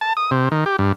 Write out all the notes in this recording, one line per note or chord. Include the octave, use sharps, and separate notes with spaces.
A5
D#6
C3
D#3
G4
G2